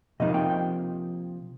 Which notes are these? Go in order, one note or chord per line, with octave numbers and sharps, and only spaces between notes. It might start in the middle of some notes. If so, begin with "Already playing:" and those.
C3 F3 A#3 D#4 D#5
G5
G5